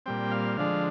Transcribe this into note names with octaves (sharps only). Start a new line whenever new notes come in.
A#2 G3 C4 G5
F5
D3 F3 G#3 D4 F5